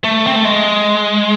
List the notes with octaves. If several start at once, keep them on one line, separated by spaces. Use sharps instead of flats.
A3
C4
A3
G#3